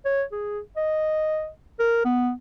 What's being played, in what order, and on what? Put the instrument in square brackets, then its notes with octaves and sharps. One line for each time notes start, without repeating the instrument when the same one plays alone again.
[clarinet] C#5
G#4
D#5
A#4
B3